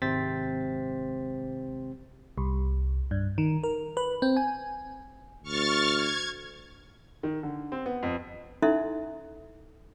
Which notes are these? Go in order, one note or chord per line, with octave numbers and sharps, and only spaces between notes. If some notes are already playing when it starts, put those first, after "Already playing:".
G#1 C3 C4 C5 A6 B6
C2
G2
D#3
A#4
B4
C4
G#5
D2 C#6 F6 A6
G#6
D#3
D3
C4
B3
F2
C#4 D#4 E4 A4 E5 C6